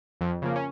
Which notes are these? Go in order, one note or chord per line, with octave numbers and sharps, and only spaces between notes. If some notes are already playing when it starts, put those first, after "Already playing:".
F2
C#3 F3 A#3
C#4